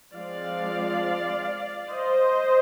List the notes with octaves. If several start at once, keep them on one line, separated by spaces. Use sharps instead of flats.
F3 G#3 C4 D5 F5
C5 D#5